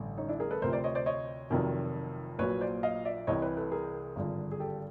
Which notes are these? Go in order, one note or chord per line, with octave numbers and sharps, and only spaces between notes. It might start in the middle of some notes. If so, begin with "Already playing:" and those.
Already playing: A1 G2 D3
C#4 D#4
D4 E4
G#4 A#4
A4 B4
D2 C3 F3 A#4 C5
C5 D5
C#5 D#5
C5 D5
C#5 D#5
F1 F2 C3 D#3 F#3
A#1 A#2 F#3 B4 C#5
C5 D5
D#5 F5
D5 E5
C2 C3 E3 C#5 D#5
B4 C#5
A4 B4
G#4 A#4
G#1 G2 D3 F3
G#4
G4 A4